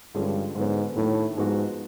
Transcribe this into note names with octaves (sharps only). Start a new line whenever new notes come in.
G2 D3 F3 G#3 C#4
G#2 D3 F#3 B3
A2 D#3 F#3 A3 D4
G#2 F3 G#3 B3 D#4 F#4